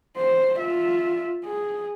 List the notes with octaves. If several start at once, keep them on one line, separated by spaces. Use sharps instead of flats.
C5
F4 E5
G#4